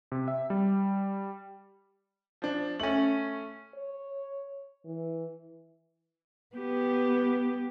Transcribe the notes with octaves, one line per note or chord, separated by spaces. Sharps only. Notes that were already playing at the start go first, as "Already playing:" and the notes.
C3
E5
G3
F3 D4
A3 C#4 F#7
C#5
E3
B3 G4